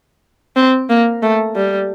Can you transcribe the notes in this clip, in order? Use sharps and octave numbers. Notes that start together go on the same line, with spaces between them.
C4
A#3
A3
G3